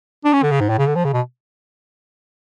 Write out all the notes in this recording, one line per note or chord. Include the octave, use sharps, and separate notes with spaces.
D4
C#4
D3
C#3
G#2
A2
C#3
D3
F3
C#3
B2